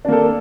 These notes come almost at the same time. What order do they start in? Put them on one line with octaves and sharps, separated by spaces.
D4 A#3 A4